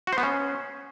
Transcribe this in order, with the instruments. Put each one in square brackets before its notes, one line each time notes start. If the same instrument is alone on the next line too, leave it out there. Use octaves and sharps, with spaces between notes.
[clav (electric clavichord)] F#4
C5
B3
C#4